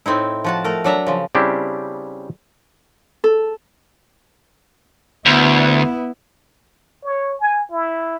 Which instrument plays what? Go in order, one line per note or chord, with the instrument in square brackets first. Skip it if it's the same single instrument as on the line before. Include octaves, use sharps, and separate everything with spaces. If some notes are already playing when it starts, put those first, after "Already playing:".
[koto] A2 C4 D#4 E4
F3 F#4 A5
A3 A#4
F#3 D4 E5 A#5
C#3 F3
[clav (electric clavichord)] C#3 G3 C4 D4 E4 G4
[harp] A4
[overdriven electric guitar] D2 [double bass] B3 E4
[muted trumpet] C#5
G#5
E4